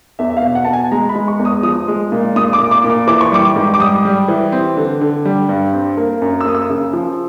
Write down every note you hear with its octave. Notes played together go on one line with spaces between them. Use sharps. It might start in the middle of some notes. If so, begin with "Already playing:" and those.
E2 E5
E5
F5
B2
F#5
B2 A5
G#5
G#3 A#5
B5
G#3
C#6
E2
D#6
F3 D#6
G#3
A#2
A#2 D#6
D6
A#2
D6
A#2
D6
E3 D6
C#6
G3 D6
G#2
D6
G3 D#6
G3
E3
C4
D3
D3
G3
G2
C4
A#3
F#2
E6
A#3 D#6
E6
C#3
F3